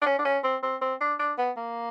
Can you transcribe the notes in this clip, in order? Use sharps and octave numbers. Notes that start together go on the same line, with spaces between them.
D4
C#4
D4
C#4
C4
C4
C4
D4
D4
B3
A#3